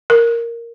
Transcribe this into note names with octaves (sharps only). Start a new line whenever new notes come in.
A#4